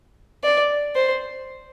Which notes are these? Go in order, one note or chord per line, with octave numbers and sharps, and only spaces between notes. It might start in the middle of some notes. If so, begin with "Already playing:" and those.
D5
C5